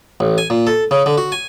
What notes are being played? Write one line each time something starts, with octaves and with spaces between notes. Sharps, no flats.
A1
G#5
A#2
A4
C#3
D3
F#4
G#5